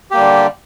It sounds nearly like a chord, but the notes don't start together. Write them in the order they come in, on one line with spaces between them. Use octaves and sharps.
G4 A#3 G3 D3